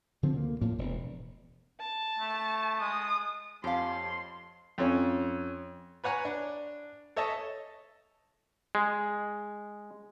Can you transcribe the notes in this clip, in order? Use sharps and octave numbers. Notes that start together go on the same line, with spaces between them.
D3 F3 C4
D2 A#3
A2 F3 A#3
E1
A5
A3
G#3 D#6
F2 G4 C#5 F5 G#5 A5 C6
F2 C#4
B4 C#5 F#5 G#5 A#5
D4
A4 C#5 D#5 E5 A5
G#3